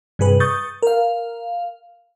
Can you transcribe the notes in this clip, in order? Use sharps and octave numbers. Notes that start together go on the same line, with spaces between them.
G2 C3 G#4 B4
C#6 D#6 G6 A6
A#4 F5